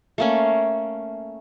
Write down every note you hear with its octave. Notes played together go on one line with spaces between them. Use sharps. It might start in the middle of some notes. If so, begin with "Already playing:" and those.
A3 A#3 C#4